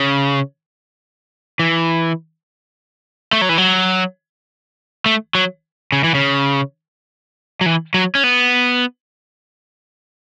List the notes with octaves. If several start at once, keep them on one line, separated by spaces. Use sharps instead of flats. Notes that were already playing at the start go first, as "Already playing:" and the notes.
Already playing: C#3
E3
A3
F#3
E3
F#3
A3
F#3
C#3
E3
C#3
F#3
E3
F#3
C#4
B3